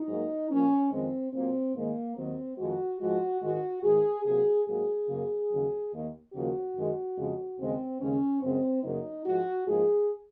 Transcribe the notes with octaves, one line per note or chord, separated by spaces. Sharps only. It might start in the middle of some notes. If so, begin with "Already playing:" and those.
Already playing: D#4
G#2 F#3 A#3
A#2 F3 A#3 C#4
F2 D#3 G#3 C4
A#2 F#3 A#3 C4
G#2 D#3 G#3 A#3
D#2 D#3 F#3 A#3 C4
F2 D#3 G#3 F#4
G#2 F3 G#3 F#4
G#2 D#3 G#3 F#4
G#2 D#3 G#3 G#4
C3 F#3 A#3 G#4
G#2 F#3 A#3 G#4
F#2 C#3 F#3 A#3
D#2 C#3 F#3
D#2 D#3 A#3
D#2 C#3 F3 A#3 F#4
F#2 D#3 G#3
F2 C#3 G#3
D#2 C#3 G#3 C4
D#2 C#3 G#3 C#4
F#2 C#3 G#3 C4
F#2 C#3 F#3 A#3 D#4
G#2 F3 G#3 F#4
G#2 F3 A#3 G#4